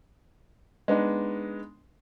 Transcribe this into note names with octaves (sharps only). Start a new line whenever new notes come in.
G#3 B3 D4 D#4